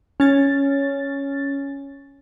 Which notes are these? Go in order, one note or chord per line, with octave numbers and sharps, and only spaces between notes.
C#4 A6